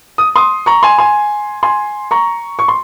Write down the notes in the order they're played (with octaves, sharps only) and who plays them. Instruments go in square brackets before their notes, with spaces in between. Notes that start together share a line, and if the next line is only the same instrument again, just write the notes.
[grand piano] D#6
C6 D#6
A#5 C#6
G#5 C6
G#5 C6
G#5 C6
A#5 C#6
C#6
C6